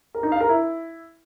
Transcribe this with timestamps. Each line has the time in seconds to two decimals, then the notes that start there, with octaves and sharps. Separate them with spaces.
0.15 A#4
0.23 D#4
0.32 F5
0.40 A#4
0.49 E4